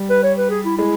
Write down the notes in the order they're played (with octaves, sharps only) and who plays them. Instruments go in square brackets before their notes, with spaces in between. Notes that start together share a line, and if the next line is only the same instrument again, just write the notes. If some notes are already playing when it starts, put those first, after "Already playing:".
Already playing: [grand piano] G3
[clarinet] B4
C#5
B4
G#4
E4
[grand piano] G#3 [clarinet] E4